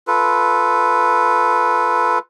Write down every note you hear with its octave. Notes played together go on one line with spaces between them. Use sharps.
F4 A4 B4